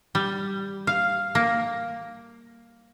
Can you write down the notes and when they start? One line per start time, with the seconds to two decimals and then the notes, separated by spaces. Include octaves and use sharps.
0.15 G3
0.87 F5
1.35 A#3